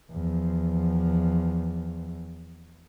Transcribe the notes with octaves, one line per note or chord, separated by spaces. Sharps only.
E2 F3